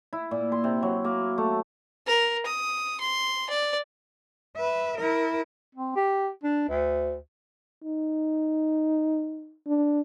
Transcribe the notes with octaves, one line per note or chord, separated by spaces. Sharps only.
E4
A#2
C6
C3
F#3
A#3
A3
A#4
D#6
C6
D5
B4 E5
E4 A#4
C4
G4
D4
D2
D#4
D4